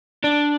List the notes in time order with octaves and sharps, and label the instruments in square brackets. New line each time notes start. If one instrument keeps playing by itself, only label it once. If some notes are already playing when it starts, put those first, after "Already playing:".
[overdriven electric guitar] D4